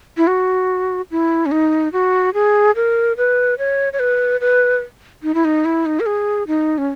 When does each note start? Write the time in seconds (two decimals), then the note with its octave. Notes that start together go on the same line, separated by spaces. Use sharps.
0.17 E4
0.27 F#4
1.11 E4
1.46 C#4
1.51 D#4
1.93 F#4
2.34 G#4
2.76 A#4
3.17 B4
3.59 C#5
3.93 C#5
3.99 B4
4.41 B4
5.23 D#4
5.34 E4
5.45 D#4
5.65 E4
5.86 D#4
6.00 A#4
6.06 G#4
6.47 D#4
6.78 C#4